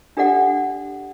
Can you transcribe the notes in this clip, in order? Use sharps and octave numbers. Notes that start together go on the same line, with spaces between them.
D4 G4 A4 D5 F#5